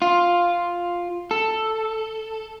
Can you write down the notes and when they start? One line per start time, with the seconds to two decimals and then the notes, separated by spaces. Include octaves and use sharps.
0.02 F4
1.31 A4